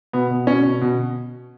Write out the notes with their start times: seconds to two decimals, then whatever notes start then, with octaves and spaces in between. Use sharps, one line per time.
0.13 B2 B3
0.30 B2
0.47 B2 C#4
0.65 B2
0.81 B2